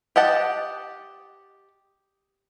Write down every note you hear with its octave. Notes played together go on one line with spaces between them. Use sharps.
G4 D#5 F#5 A5